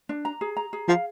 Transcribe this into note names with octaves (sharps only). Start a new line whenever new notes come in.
D4
A#5
G#4
A#5
G#4
F3 F5